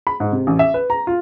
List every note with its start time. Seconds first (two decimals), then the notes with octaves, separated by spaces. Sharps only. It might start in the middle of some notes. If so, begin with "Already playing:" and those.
0.07 B5
0.20 G#2
0.32 C3
0.47 A1
0.59 E5
0.74 B4
0.90 A#5
1.07 F4